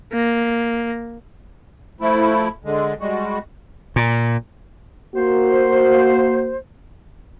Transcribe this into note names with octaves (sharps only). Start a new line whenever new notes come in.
A#3
F3 A3 E4
D3 G#3
G3 G#3 F#4
A#2
A#3 F#4 C5